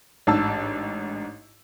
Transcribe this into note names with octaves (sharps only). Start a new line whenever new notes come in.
A1 G#2 D4 A5 E6